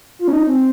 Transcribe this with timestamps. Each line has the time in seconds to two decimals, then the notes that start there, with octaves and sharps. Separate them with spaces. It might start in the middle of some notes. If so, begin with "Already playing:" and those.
0.19 F4
0.28 C#4
0.33 D#4
0.47 C4